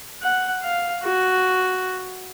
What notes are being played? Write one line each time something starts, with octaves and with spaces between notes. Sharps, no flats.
F#5
F5
F#4